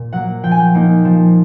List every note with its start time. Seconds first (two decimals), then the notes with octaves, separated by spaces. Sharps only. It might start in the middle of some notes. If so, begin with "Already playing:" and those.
Already playing: A#2
0.13 F#3 A#3 F#5
0.43 F3 G5
0.51 G#5
0.59 G5
0.74 A#3 D#4
1.05 F3